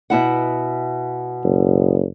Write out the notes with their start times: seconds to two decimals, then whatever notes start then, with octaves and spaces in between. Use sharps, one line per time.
0.10 B2 E4 F#5
1.44 F#1